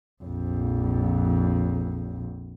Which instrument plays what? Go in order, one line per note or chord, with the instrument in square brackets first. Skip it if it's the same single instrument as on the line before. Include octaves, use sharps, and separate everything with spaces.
[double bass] A#1 F2